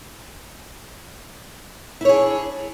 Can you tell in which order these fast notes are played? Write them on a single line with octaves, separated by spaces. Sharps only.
E4 C#5 G#4 D4